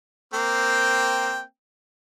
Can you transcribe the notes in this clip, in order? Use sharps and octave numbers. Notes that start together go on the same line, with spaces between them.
A#3 C4 G5